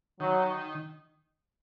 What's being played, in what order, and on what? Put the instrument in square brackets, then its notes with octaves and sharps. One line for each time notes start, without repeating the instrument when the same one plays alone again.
[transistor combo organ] D#3 [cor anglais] F#3